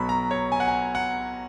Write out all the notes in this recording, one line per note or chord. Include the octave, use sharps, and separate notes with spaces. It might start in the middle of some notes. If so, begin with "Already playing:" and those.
Already playing: B1 B2 F#3 B5
A#5
C#5
G#5
F#5
G#5
F#5